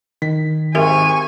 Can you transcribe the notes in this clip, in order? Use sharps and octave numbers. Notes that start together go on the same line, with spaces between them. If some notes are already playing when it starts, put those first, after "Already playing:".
D#3 B6
G#1 G#2 G4 A#4 E5 G#5 C#6